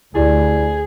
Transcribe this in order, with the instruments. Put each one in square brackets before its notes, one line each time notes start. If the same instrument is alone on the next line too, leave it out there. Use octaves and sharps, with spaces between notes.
[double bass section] D2 [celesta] E4 G4 D5 [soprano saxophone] G#4